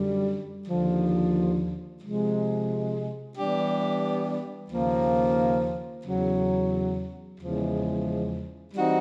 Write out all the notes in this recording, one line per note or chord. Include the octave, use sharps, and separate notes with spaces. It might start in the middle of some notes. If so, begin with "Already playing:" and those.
Already playing: F#2 D3 G3
D#2 D3 F3
C3 F3 G#3
E3 G3 B3 D4 G4
D#2 C#3 F3 A#3
E2 C#3 F#3
E2 C#3 F3 G#3
E3 G3 C4 D#4 F#4